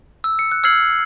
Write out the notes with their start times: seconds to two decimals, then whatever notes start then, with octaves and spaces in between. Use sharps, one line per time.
0.24 E6
0.39 C#7
0.52 F#6
0.64 E6 F6 G#6 C7 F#7